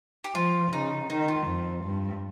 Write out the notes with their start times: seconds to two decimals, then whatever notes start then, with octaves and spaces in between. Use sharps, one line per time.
0.24 G4
0.35 F3 F4
0.72 C#3 D#4
1.10 D#3 D#4
1.28 F4
1.47 F2
1.84 G2